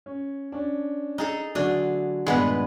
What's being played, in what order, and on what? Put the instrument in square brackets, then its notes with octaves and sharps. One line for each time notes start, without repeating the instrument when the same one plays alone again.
[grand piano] C#4
C#4 D4
[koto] D#4 G#4 A4
[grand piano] D3 F#3 [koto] A3 D4 G#4
[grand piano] D#1 G2 A#2 [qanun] G#3 B3 [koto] D4 B4